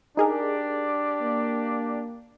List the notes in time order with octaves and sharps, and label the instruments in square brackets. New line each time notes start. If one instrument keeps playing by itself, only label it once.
[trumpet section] D4 G4 D5 [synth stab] D#4 G#4 A#4
[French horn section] A#3